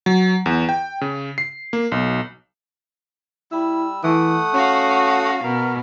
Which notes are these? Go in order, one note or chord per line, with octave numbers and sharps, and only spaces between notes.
F#3
E2
G5
C#3
C7
A#3
B1
G3 E4 E6
E3 A3 F#5 D#6
C#4 F#4 F5
B2 A#4